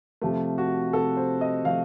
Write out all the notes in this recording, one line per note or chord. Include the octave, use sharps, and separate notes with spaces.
C3 F3 A3
F#4
C3 F3 A3 A4
C5
D#5
C3 F3 A3 F5